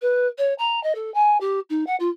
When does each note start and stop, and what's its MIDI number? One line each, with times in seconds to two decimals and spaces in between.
0.02 0.27 71
0.38 0.54 73
0.58 0.82 82
0.83 0.95 75
0.95 1.12 69
1.14 1.40 80
1.41 1.60 67
1.70 1.86 63
1.87 1.96 78
2.00 2.10 65